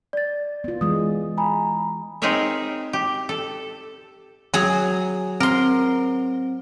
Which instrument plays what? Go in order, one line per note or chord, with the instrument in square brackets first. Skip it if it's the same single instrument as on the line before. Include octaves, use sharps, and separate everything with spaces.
[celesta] D5 A6
[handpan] B3 F4
[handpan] E3 G#3 [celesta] D#6
[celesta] G#5 A#5 B5
[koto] C4 D#4 G#4 A#4 C#5 E5
G4
A4
[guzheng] F#3 G#4
[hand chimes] C4 [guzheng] A#4 C6